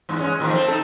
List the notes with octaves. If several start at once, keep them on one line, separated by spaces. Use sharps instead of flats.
E2 G2 G#3
G#3 C#4
A2 D#3 F3
A3 C4
D#4 A4